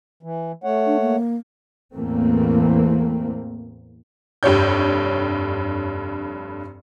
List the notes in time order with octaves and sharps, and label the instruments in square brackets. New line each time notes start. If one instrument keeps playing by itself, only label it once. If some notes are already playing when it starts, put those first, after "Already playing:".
[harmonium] E3
A3 C#5 F#5
[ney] D4
A#3
[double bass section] E2 A2 E3 A3 A#3 C4
[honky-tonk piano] F1 G2 G4 C#5 G6